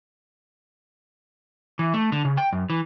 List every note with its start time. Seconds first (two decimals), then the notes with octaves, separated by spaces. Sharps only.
1.79 E3
1.94 A3
2.12 D3
2.25 C#3
2.37 G5
2.53 F#2
2.70 E3